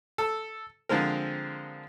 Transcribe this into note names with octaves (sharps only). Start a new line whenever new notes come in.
A4 E6
D3 F3 G#3 C4 A#4